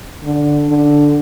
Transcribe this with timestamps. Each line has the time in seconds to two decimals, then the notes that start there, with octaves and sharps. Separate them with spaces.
0.23 D3
0.68 D3